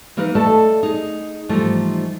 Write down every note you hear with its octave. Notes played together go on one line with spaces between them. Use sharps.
E3 A#3 D#4 A#4 B4
A3 A4 D5 D#5 A5
D#4 G#4
G#2 E3 F3 G3 A3 D#4